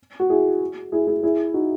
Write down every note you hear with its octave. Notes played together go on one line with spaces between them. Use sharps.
F#4
E4 G#4
E4 G#4
E4 G#4
E4 G#4
D#4 F#4